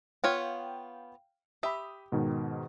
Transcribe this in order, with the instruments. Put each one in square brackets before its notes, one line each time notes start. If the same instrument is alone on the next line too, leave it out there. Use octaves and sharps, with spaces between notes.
[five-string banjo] B3 F4 C#5 [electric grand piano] F5 G5
[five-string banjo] G4 E5 [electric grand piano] B5 D#6
[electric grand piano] G#2 B2 D#3